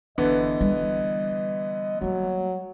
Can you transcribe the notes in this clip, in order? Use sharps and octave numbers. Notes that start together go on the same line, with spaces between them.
F#1 D3 E3 B3 D#5
G3
F#3 G3 A#3